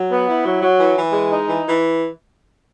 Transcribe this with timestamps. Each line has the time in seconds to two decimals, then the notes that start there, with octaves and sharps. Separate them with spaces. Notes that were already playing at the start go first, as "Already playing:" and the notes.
Already playing: F#3
0.11 B3
0.28 E4
0.45 F#3
0.62 F#3
0.79 E3
0.97 E3
1.12 G#3
1.30 D#4
1.47 E3
1.65 E3